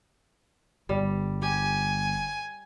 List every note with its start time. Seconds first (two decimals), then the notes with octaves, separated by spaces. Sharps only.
0.89 G1 G3
1.42 G4 G#5